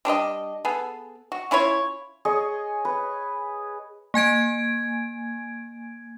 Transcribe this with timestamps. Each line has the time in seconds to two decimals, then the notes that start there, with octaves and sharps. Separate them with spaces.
0.05 G3 D4 B4 D#5
0.65 B3 G#4 A4
1.32 F#4
1.51 C#4 E4 F4 C#5
2.25 G#4 C#5 D#5
2.85 B4
4.14 A#3 G#5 G#6 D7